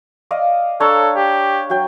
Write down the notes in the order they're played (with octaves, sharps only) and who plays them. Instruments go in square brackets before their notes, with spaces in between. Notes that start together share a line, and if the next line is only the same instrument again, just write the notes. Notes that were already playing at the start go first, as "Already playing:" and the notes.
[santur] D5 D#5 F5
[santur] D4 C#5 A#5 [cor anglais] A4
[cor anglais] G4
[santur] F#3 G5